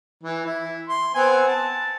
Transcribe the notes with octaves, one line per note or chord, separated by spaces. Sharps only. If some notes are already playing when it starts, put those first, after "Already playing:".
E3
E4
C6
B3 C4 G#5
A5